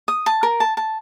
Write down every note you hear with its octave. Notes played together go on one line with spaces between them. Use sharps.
D#6
A5
A#4
A5
A5